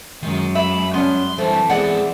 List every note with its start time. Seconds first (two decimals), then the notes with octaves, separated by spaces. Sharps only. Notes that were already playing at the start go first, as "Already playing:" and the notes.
0.23 F#2 D#3 G#3
0.55 E5 B5
0.94 G3 B3 C#4 C6
1.38 D3 E3 G3 A3 C4 C5
1.70 G#3 B3 G#4 D5 F#5